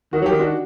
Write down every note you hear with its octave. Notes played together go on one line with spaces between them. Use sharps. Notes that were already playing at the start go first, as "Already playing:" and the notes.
D#3 F#4
F#3
D#3 G4
D4 F#4